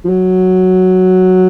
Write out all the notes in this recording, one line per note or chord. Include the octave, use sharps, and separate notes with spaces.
F3
F#3